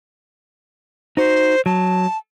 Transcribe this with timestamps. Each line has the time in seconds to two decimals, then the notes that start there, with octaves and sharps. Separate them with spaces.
1.17 D#4 F#4 C5
1.66 F#3 A5